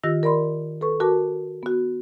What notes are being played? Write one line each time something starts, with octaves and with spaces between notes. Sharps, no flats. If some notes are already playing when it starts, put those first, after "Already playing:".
D#3 F4 G4 E6 A#6
A#4 D5 B5 C6
A4 B4 C#6
F#4 A#4 A5 D6
B3 F#4